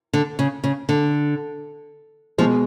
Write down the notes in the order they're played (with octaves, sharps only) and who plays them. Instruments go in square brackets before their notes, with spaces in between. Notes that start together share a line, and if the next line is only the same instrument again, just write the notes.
[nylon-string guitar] D3
C#3
C#3
D3
[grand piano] B2 G#3 [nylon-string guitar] F3